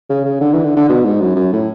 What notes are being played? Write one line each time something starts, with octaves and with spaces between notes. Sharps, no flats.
C#3
C#3
D3
E3
D3
D3
B2
G#2
F#2
F#2
A2